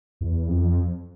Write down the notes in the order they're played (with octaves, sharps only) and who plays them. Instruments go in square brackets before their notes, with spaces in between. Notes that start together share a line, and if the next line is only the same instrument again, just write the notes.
[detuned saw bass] E2
F2